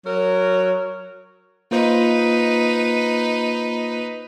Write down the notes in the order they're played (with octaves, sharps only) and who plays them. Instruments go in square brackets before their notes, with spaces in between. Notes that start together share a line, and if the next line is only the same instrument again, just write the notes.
[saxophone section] F#3 A#4 C#5
[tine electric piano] A#3 F4 C5 [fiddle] D#4 B4